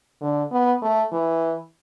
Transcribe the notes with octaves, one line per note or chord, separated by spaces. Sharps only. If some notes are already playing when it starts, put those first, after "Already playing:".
D3
B3
A3
E3